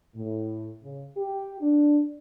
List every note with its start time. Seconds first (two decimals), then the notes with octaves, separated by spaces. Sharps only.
0.16 A2
0.84 C#3
1.17 G4
1.61 D4